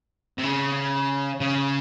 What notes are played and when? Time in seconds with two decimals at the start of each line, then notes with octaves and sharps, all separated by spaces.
0.38 C3
0.43 C#3
1.40 C#3